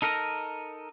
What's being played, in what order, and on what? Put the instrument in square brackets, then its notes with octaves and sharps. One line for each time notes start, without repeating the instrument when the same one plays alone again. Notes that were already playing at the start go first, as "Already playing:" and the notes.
[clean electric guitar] D#4 A4 A#4 D#5